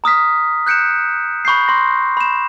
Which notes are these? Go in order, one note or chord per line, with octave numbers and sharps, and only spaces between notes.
A#5 D#6 F6 B6
F#6 G6 C#7 D7 E7
B5 C#6 G6 C7
C6 A#6
B5 E7